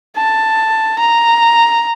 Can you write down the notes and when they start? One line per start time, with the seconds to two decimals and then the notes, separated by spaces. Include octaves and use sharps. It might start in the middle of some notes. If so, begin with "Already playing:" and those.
0.16 A5
0.99 A#5